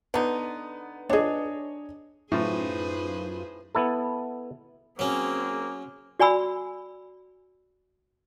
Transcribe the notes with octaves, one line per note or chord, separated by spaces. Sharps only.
D3 B3 D#4
D4 G#4 C#5 D#5
F#2 A2 D#4 F4 G#4 B4 C5
B3 E4 A4
F#3 A#3 C4 C#4 G#4
F#4 D5 G#5 B5 E6